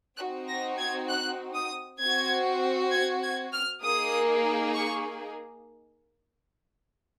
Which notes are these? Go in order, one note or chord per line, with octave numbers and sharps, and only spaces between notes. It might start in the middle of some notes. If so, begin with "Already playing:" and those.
C4 D#4 F#4 F#6
A#6
G#6
F#6
D#6
C4 F#4 G#6
G#6
G#6
F6
A#3 D#4 G#4 D#6
C#6